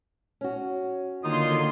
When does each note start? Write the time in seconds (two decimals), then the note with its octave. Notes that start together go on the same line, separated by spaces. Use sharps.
0.41 C#4 F#4
1.24 D3 D#3 A#3 D#4 F4 C6 D#6